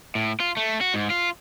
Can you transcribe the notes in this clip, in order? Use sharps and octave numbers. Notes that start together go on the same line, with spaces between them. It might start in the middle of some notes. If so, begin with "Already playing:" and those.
A2
F4
A3
F#4
G#2
F4